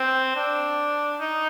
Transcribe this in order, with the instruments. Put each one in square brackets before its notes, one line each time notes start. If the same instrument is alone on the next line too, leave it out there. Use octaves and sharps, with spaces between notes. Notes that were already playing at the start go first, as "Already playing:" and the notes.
Already playing: [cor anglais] C4
D4
D#4